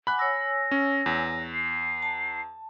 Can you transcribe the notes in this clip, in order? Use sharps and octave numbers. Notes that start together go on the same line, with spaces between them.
F#5 G#5 B5 D6 F#6
C#5 G#5 E6 A#6
C#4
E2
C7
A5